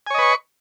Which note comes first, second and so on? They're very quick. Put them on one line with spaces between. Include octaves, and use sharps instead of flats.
G#5 C#5 D#5 B4 C#6